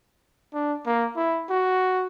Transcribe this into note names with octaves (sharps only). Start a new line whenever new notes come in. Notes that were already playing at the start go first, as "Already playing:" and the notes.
D4
A#3
E4
F#4